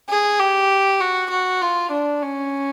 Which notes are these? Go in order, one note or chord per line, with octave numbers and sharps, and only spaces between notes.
G#4
G4
F#4
F#4
F4
D4
C#4